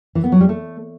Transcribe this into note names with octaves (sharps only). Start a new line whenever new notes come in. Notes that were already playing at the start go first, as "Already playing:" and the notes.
E3
B3
F#3
G3
A3